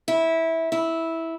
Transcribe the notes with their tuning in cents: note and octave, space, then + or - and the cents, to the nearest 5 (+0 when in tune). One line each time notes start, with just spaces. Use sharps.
E4 -15
E4 -10